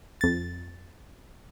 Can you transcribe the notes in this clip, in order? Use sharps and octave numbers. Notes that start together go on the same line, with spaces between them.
F2 A6